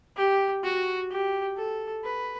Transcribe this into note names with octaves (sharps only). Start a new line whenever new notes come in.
G4
F#4
G4
A4
B4